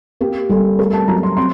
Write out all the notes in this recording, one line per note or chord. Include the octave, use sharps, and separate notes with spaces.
A#3 G4
G3 A4
A3 A#4
A5
F#3 A#5
C6
C4 C6